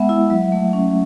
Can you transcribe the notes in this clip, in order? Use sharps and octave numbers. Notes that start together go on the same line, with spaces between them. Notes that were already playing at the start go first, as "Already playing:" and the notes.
Already playing: G#3 B3 E5 F#5
E4
F#3
A3
C#4